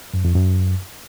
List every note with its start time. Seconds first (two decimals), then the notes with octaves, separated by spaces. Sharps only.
0.14 F#2
0.25 F2
0.36 F#2